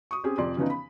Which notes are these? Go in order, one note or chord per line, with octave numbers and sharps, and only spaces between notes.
C#6 D#6
C4 C#4 G4 G#4
F1 F2 D5 C6
C#3 E3 F3 B3 C#4 D#4
B5